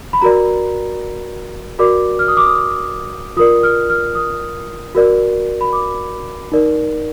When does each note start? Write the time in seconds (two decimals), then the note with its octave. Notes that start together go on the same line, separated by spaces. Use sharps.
0.13 B5
0.21 F#4 A#4 D5 A#5
1.79 F#4 A#4 D5 D6
2.19 F6
2.28 D#6
2.37 D6
2.46 D#6
3.37 F4 A#4 D5 D#6
3.63 F6
3.90 F6
4.15 D#6
4.95 F#4 A#4 D5
5.61 B5
5.73 D6
6.52 D#4 A#4 D5